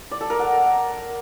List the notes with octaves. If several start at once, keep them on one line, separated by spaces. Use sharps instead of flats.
D5
A4
A#4
F#5